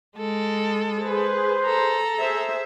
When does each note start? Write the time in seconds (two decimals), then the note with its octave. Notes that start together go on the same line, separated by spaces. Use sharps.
0.18 G#3 A4
0.98 G#4 B4 C5
1.65 A4 A#5
2.20 G#4 C5 E5